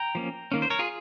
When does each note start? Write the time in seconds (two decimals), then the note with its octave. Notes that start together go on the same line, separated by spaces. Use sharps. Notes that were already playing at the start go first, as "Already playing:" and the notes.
Already playing: G5 A#5
0.15 F3 A#3 C#4
0.52 D#3 A#3 C#4
0.62 C5
0.70 A#4 C#5
0.79 F4 G#4